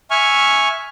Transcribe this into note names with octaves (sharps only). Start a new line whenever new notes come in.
E5 G#5 C#6 F6